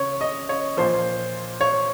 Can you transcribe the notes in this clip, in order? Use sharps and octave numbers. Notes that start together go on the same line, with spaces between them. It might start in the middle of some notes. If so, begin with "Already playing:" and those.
Already playing: C#3 C#5
D#5
C#5
A#2 F3 C5
C#5